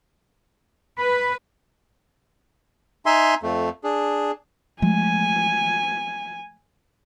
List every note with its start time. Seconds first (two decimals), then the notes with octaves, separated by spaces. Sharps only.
0.98 B4 B5
3.06 D#4 E5 G#5 C6
3.43 F2 A3
3.84 D4 G#4
4.82 F3 G#3 A3 G#5